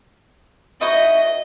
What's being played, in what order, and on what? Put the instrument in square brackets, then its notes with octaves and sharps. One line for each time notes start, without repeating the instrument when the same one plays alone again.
[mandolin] D#4 E4 F#4 [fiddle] D#5